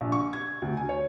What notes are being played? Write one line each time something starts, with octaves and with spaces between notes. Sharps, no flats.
A#1
C#6
G#6
D2
G#5
C#5